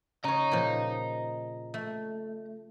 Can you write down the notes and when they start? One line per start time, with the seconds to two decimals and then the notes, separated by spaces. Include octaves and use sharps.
0.24 C#3 C#5 D#5 A#5
0.52 A#2 F3
1.74 A3